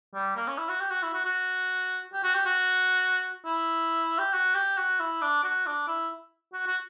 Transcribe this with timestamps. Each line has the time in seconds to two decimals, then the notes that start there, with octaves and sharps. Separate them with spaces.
0.14 G3
0.36 A#3
0.47 C#4
0.58 E4
0.69 F#4
0.81 G4
0.91 F#4
1.03 E4
1.13 F#4
1.24 F#4
2.13 G4
2.23 F#4
2.35 G4
2.45 F#4
3.46 E4
4.19 G4
4.34 F#4
4.55 G4
4.78 F#4
5.00 E4
5.22 D4
5.44 F#4
5.66 D4
5.88 E4
6.53 F#4
6.67 F#4